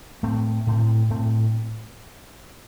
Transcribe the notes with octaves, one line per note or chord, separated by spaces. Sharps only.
A2 A3 C4
A2 A3 C4
A2 A3 C4